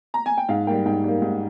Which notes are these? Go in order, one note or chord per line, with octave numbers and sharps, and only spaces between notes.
A#5
G#5
G5
G#2 F5
G3 A#3 G5
G#2 G5
G3 A#3
G#2